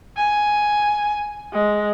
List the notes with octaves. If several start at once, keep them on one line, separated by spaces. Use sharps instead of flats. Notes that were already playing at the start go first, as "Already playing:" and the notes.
G#5
G#3